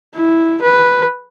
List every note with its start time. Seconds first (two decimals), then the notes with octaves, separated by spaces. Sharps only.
0.15 E4
0.62 B4